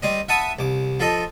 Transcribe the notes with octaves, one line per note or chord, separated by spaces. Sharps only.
G3 C4 D#5
E5 F#5 A5 B5 D#6
C2 D6
F3 A4 D#5